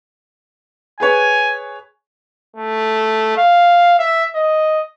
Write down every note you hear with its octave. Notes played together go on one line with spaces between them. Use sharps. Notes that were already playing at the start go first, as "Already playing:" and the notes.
G#4 B4 C#5 G#5
A3
F5
E5
D#5